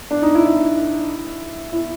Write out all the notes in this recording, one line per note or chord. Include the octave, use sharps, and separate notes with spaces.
D4
D#4
E4
E4
E4